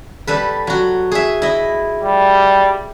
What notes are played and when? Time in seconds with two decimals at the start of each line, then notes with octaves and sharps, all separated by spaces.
0.27 G3 A4 B4
0.67 F#3 F#4
1.11 G#4 E5
1.42 E4 D#5
2.02 G3